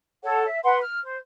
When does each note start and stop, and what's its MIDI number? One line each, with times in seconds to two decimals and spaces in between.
0.24 0.45 69
0.24 0.45 73
0.24 0.45 78
0.47 0.59 76
0.64 0.80 71
0.64 0.80 78
0.64 0.80 84
0.81 1.00 89
1.03 1.17 72